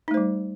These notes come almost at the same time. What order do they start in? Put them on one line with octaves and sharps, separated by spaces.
D#4 A3 C5 G3